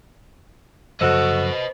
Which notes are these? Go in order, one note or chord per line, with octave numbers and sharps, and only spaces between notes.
F#2 C#3 F3 F#4 A4 B4 C5 D#5